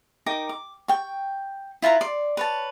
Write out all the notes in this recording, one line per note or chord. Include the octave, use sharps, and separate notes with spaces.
D#4 A#4 G5 D6
D6
G5 C#6
E4 F4 B4 A#5
D5 C6
B4 C#5 A5